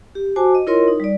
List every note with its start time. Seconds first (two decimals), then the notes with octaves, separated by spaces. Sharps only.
0.15 G4
0.36 F#4 C5 G#5 A5 D6
0.55 D#5
0.67 E4 F4 A#4 C#5 D#5 C6
0.88 D#4
1.00 G3 D5